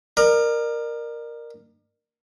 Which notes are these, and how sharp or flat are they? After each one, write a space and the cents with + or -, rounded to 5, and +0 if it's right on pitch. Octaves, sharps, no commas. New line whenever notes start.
A#4 +0 D5 +40